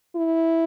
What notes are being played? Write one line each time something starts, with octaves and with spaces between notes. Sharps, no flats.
E4